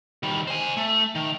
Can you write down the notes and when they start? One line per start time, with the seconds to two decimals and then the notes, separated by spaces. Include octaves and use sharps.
0.23 D#3 G3
0.47 C5 G#5
0.77 A3
1.15 D#3